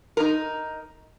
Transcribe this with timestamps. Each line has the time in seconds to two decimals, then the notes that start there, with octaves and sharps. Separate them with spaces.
0.17 D#4 A#4